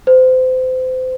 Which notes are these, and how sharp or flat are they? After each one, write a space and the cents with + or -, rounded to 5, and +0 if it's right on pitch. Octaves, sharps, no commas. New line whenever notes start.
C5 -30